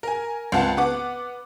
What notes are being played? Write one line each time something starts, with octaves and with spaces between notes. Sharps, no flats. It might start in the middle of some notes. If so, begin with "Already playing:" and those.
A#4 G#5
C#2 C4 F5 F#5 A5
B3 F#5 D6